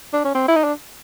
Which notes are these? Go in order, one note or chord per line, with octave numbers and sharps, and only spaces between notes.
D4
C#4
C4
E4
D#4
D4